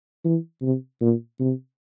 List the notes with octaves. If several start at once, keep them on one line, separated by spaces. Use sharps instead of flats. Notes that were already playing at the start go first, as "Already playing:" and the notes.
E3
C3
A#2
C3